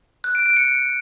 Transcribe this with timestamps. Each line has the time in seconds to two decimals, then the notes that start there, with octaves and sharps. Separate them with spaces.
0.24 F#6
0.35 D7
0.46 D7
0.57 C#7